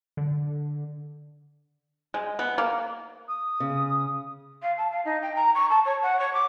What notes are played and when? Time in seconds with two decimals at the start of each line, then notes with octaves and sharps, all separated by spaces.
0.17 D3
2.14 G#3
2.39 B3
2.58 A#3
3.27 D#6
3.60 C#3
4.62 F5
4.77 A5
4.91 F5
5.05 D#4
5.22 G5
5.36 A#5
5.55 C#6
5.70 A5
5.85 C#5
6.02 F#5
6.19 C#5
6.33 D6